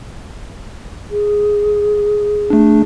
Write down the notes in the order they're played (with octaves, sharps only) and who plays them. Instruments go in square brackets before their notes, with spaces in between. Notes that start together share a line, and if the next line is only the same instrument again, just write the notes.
[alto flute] G#4
[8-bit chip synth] A3 D4